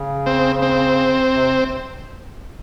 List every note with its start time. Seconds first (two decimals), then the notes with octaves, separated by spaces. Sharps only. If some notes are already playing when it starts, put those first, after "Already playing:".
Already playing: C#3
0.26 C4
0.62 C4
1.35 C3